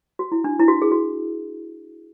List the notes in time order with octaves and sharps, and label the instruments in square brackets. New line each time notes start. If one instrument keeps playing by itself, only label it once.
[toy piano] F#4
E4
D4
E4
F#4
G#4
F#4